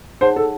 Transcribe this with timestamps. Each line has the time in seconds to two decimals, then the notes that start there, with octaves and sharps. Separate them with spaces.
0.21 D#4 G#4 C5 C#5 F#5 A5
0.36 A4